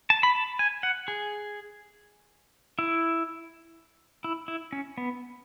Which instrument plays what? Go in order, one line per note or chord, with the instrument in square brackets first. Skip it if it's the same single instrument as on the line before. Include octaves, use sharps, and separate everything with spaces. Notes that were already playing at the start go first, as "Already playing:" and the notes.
[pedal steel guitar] A5
B5
A5
G#5
F#5
G#4
E4
E4
E4
C#4
B3